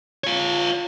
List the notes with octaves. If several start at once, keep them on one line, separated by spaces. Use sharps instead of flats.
F4 C#5